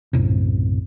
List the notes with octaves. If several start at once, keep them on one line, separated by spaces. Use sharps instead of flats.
B1 F#2 A2 C3